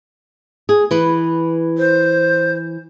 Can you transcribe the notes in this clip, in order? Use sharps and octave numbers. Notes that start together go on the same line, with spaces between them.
G#4
E3 B4
C5